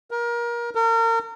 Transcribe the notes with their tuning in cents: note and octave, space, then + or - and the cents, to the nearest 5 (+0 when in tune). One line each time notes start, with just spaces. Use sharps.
A#4 +25
A#4 -35